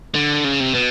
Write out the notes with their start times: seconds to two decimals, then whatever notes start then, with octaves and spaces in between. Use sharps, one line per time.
0.15 D3
0.44 C#3
0.60 C3
0.74 B2